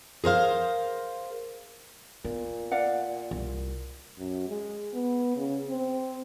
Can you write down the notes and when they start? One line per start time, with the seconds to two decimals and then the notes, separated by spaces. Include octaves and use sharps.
0.24 G#4 A#4 C5 F5
2.25 A#2 B3
2.71 D5 F5 F#5
3.31 C2
4.18 F#2
4.49 G#3
4.94 B3
5.36 C#3
5.69 C4